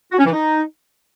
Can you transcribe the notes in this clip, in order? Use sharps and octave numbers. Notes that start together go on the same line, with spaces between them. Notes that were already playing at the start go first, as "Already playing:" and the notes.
F#4
C#4
E3
D#4